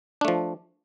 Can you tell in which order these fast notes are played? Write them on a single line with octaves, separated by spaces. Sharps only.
D4 A3 F3